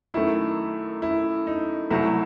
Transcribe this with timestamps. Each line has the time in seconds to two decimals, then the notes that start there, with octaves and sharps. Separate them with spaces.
0.14 F#2 D#3 A3 E4
1.02 E4
1.47 D#4
1.90 C2 C3 F#3 A3 E4